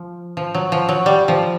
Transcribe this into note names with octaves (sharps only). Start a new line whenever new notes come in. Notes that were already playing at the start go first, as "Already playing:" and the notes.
Already playing: F3
F3
F#3
F3
F#3
G3
F3